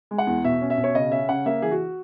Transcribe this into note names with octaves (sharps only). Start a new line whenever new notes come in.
G#3
F#5
E2
B2 E5
C#4
E5
B2
C#5
C#3 D#5
C#4 E5
C#3 F#5
A#3 E5
E3 G#4
F#4